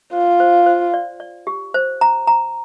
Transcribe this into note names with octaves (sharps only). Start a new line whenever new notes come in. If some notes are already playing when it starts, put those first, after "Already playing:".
F4 C5
C5
C5
D5
D5
G4
C5
A#5
A#5